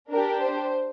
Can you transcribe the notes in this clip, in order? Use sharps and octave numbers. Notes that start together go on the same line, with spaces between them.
D4 G4 A#4
C5